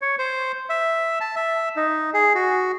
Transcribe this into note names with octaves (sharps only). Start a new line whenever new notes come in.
C#5
C5
E5
A5
E5
D#4
G#4
F#4